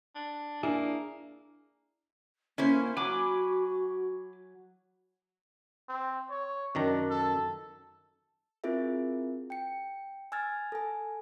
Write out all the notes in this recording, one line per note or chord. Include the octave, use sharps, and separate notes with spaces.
D4
A#3 D4 E4 G#4
A#3 C#4 E4 C5
F#3 F#4 G#5 B5 D6
C4
C#5
F#2 D#3 D4 A#5
A4
C4 E4 F4 G#4 A#4 E5
G5 C#7
G#5 E6 F6 G#6 A6
A4 G#5